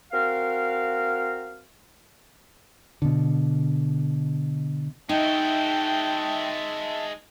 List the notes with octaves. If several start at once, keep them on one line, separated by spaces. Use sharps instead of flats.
C4 F#4 A#4 F5
B2 D3
G#3 D#4 F#4 E5 G5 A5